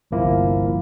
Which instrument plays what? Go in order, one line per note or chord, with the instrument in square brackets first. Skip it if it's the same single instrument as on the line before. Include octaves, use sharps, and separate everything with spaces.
[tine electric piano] G1 C2 F3 A#3 E4